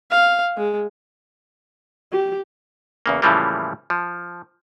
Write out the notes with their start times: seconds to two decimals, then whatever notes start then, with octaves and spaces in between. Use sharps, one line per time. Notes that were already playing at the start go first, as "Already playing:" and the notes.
0.11 F5
0.57 G#3
2.12 G4
3.06 E2 C#3 A#3
3.22 A2 C#3 E3 F3 G3 A#3
3.90 F3